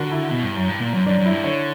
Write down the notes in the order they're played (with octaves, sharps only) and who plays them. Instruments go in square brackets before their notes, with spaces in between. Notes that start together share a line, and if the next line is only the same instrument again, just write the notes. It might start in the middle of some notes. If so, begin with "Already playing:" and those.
Already playing: [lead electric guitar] D3 [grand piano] F#4 A#4
[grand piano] E4
[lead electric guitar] B2
G2
F#2
G2
A#2
F#2
[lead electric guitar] F#2 [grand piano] D4
[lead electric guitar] F#2
[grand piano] E4
[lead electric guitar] G2
[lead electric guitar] D3 [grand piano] C#5